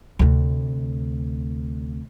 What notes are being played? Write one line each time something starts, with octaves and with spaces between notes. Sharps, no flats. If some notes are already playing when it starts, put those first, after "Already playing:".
D2 C3